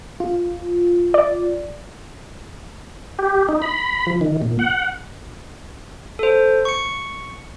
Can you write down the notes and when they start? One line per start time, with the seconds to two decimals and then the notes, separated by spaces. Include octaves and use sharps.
0.20 F4
1.14 D5
3.19 G4
3.49 D#4
3.62 B5
4.07 F3
4.21 D#3
4.42 A#2
4.59 F#5
6.19 A4 C5
6.65 C#6 C#7